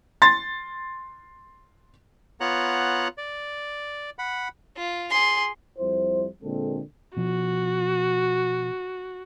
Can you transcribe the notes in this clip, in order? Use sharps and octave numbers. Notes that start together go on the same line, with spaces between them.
C6 A6
B3 F4 C#5 F#5 A#5 F#6
D5
F#5 B5
F4
G#4 C6
F2 G3 E4 C5
A#2 D3 G#3 A#3 C4 A4
B2 F3 F#4